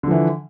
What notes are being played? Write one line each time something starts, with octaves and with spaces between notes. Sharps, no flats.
D3 E3 F3